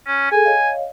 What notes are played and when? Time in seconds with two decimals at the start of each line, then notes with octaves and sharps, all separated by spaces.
0.07 C#4
0.32 G#4 A4 G#5
0.45 C#5 D#5 F5